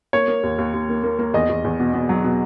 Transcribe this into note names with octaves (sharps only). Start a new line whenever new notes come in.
A#3 C#5
A#3
D#2
D#2
D#2
A#3
A#3
A#3
E2 D#5
E2
E2
B2
B2
F#3
B2